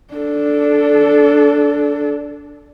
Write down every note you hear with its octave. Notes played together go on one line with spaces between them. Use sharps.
D4 A4